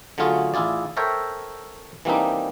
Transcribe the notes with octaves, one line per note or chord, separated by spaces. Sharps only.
D3 F#3 A3 C#4 F4 G#4
A1 E4 F4 G#4 D5
A4 A#4 C5 C#5 E5 G5
E3 G3 A#3 C4 D4 D#4